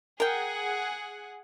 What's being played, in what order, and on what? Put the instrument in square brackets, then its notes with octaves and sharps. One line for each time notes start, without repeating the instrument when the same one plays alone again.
[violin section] G#4 F#5 [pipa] A#4 G5